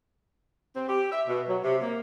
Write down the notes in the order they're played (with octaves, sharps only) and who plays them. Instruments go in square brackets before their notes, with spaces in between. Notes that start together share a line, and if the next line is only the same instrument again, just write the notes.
[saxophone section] C4
G4
E5
B2
F#3
C3
A#3